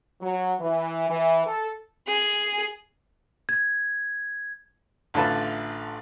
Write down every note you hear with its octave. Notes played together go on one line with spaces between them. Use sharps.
F#3
E3
E3
A4
G#4
G#6
A1 D3 A3 F4 B4 A5